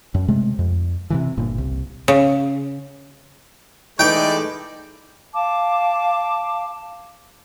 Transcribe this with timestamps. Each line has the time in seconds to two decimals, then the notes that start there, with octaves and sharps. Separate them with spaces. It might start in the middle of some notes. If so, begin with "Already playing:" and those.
0.14 F#2
0.28 C3 G#3 A3
0.59 F2
1.10 C3 D#3 E3
1.37 G1 A#2
1.58 C2
2.08 C#3
3.99 E3 G#3 A3 D#4 B4 D5 G5
5.34 F5 A5 D6